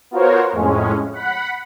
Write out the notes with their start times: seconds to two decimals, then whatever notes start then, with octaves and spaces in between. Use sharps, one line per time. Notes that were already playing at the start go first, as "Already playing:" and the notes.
0.11 B3 F4 F#4 A#4 C5 C#5
0.52 F2 A2 G#3 C#4
1.13 F#5 B5